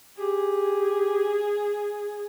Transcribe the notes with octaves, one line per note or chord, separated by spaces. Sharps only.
G4 G#4